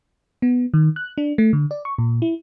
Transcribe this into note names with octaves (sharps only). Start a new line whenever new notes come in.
B3
D#3
F#6
D4
A3
D3
D5
C#6
A#2
E4